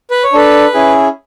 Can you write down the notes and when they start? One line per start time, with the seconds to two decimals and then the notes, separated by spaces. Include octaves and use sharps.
0.11 B4
0.24 C#5
0.33 D4 A4 B4
0.74 C#4 E4 G#4